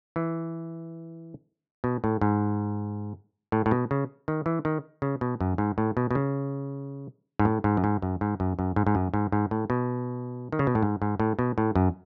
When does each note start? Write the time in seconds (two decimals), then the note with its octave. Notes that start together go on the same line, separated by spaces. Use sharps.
0.16 E3
1.84 B2
2.04 A2
2.21 G#2
3.52 A2
3.66 A2
3.71 B2
3.91 C#3
4.28 D#3
4.46 E3
4.65 D#3
5.02 C#3
5.21 B2
5.41 F#2
5.58 G#2
5.78 A2
5.97 B2
6.11 B2
6.15 C#3
7.39 G#2
7.45 A2
7.64 G#2
7.77 F#2
7.84 G#2
8.02 F#2
8.21 G#2
8.40 F#2
8.59 F#2
8.76 G#2
8.87 G#2
8.95 F#2
9.14 G#2
9.32 G#2
9.51 A2
9.70 B2
10.52 D#3
10.59 C#3
10.67 B2
10.75 A2
10.83 G#2
11.02 G#2
11.20 A2
11.39 B2
11.58 A2
11.75 F#2